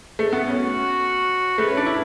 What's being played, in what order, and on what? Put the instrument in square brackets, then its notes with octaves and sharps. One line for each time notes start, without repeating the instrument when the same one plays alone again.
[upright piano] A3
B3
[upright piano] C#4 [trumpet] F#4
[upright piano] A3 [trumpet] B4
[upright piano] C#4
D4
E4